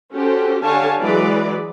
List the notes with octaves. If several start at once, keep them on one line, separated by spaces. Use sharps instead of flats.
C#4 F#4 G4 A4 C5
D3 G4 C#5 F5 G#5 A5
E3 F#3 G#3 B4 D5